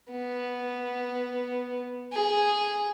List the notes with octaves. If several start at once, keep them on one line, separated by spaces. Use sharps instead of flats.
B3
G#4